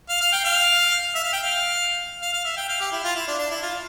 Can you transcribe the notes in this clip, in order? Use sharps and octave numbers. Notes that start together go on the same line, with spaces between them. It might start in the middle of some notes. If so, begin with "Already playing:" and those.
F5
F5
G5
F5
E5
F5
G5
F5
F5
F5
E5
G5
F5
G4
E4
F4
E4
D4
D4
E4
F4